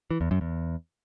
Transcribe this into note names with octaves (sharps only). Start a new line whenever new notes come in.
E3
E2
F#2
E2